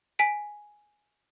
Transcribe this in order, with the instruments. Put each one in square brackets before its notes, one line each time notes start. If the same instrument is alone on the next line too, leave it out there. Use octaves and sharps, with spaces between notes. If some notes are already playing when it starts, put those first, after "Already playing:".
[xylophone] G#5 B6 D7